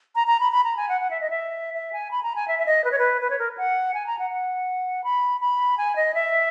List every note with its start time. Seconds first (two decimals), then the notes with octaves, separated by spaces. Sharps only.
0.16 A#5
0.27 A#5
0.40 B5
0.52 B5
0.64 A#5
0.77 G#5
0.89 F#5
1.01 F#5
1.11 E5
1.21 D#5
1.30 E5
1.74 E5
1.93 G#5
2.11 B5
2.23 A#5
2.36 G#5
2.48 E5
2.59 E5
2.66 D#5
2.84 B4
2.92 C#5
2.99 B4
3.21 B4
3.30 C#5
3.39 A#4
3.58 F#5
3.94 G#5
4.07 A#5
4.19 F#5
4.31 F#5
5.04 B5
5.41 B5
5.78 G#5
5.96 D#5
6.14 E5